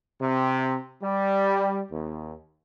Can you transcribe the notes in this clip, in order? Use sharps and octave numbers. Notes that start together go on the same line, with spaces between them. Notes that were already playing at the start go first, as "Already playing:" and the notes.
C3
G3
D#2